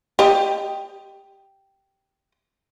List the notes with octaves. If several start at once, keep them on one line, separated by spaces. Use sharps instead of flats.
G4 D#5